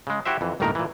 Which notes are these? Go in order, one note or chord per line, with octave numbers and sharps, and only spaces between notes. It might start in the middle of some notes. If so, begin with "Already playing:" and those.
C#3 G#3
E4 F#4 G4 C5 E5
F2 E3
G1 D#2 A2 D#3 A#4 A#5
A#2 E3